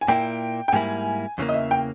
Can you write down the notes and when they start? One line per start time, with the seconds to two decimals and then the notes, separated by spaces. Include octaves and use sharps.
0.01 G#5
0.08 A#2 A#3 E4 G5
0.68 G5
0.72 G#2 G3 A#3 E4 G#5
1.38 E2 C#3 E3 A#3
1.49 D#5
1.54 E5
1.71 G5